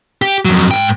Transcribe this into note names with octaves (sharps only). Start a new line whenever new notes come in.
G4
F2 F#3
G#2 G5